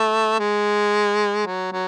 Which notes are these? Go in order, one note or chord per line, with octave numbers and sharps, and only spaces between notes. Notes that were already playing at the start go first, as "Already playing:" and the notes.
Already playing: A3
G#3
F#3
F#3